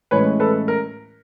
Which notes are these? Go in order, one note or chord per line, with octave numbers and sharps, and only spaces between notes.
A2 E3 G#3 C#4 B4 C#5
A4 B4
A#4